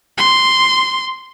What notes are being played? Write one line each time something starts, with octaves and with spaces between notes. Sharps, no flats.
C6